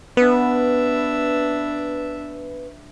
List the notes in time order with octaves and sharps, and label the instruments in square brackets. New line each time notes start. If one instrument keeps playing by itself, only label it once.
[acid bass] B3 [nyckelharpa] D4 E5 [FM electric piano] B4